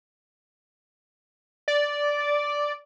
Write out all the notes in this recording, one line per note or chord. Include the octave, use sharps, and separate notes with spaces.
D5